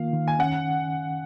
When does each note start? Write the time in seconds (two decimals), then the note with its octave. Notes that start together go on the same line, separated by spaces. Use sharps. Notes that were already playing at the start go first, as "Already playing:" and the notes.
Already playing: D#3 A#3 F4 F5
0.13 D#3
0.28 G#5
0.39 C#4 F#5